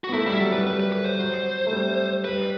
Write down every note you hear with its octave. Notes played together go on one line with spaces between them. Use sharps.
F#4
B3
A3 E4
G3 E4
F#3 A4
G3 B4
G3 B4
B4
B4
C5
F#3
A3
G3
G3 B4